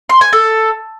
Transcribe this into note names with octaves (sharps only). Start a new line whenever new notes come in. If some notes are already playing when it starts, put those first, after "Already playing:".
C6
G#5
A4